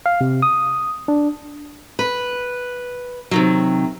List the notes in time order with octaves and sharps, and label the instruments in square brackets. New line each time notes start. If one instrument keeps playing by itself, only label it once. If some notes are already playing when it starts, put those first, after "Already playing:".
[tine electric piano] F5
C3
D#6
D4
[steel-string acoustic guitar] B4
C3 D#3 F#3